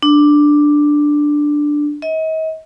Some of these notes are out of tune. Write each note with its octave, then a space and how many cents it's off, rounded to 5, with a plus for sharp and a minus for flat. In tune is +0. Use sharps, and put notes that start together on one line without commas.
D4 +5
D#5 +40